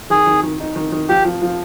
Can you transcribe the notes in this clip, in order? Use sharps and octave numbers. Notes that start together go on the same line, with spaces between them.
D#3 G#4
D#3
D#3
D#4
D#3
D#3
F3 G4
F3
F3